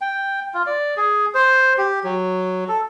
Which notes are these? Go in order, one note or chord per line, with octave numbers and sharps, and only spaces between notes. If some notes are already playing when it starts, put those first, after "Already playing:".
G5
F4
D5
G#4
C5
G4
F#3
A4